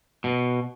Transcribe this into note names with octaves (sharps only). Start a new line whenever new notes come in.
B2